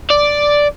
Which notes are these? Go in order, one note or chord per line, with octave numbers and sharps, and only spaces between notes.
D5